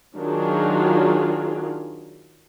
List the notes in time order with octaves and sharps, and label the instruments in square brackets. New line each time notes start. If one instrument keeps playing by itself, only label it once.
[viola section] D#3 F#3 D4 F4 F#4 G#4